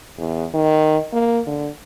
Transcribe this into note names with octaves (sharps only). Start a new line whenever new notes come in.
E2
D#3
A#3
D3